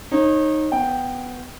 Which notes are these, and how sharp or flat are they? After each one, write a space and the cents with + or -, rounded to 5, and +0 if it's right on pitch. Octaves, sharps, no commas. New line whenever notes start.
D#4 -5 C#5 -35
B3 +10 G5 +0